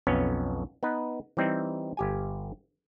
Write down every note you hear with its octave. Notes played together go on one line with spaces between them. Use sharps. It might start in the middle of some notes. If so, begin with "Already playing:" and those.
B1 F2 B3 C#4 C#5
B3 D#4 B4
E3 G3 C4 D#4
G1 G4 G#5